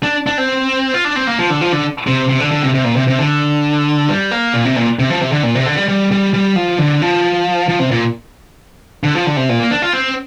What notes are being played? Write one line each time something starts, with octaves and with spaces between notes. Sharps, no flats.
D4
D4
C4
F4
D4
C4
A#3
F3
D3
F3
D3
C3
C3
D3
D3
C3
C3
A#2
C3
C3
D3
G3
A#3
A#2
C3
A#2
C3
F3
C3
D3
A#2
C3
D3
G3
G3
G3
G3
F3
D3
F3
F3
C3
A#2
D3
F3
D3
C3
A#2
A#3
D4
F4
C4